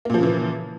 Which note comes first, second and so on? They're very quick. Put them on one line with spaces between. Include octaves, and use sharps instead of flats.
A#3 A#2 F3 C#3 E3